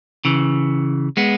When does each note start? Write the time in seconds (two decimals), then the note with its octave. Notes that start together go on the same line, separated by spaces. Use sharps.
0.25 C#3 E3
1.17 G#3 B3